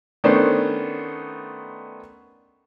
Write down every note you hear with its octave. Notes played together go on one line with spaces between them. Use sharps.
D#3 A3 B3 C#4 D4 C5